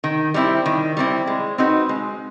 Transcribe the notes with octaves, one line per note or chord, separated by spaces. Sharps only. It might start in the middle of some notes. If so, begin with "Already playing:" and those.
D#3
G3 C4 E4
D#3
G3 C4 E4
G#3
C4 D#4 F#4 B4
G#3